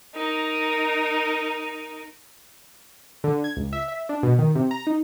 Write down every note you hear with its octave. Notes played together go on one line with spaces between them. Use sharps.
D#4 A#4
D3
G#6
C#2
E5
E5
D4
B2
D#3
C3
A#5
D#4